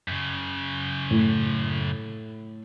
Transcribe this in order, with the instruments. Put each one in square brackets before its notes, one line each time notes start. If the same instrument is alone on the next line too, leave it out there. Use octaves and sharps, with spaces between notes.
[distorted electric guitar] F#2 C#3
[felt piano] A2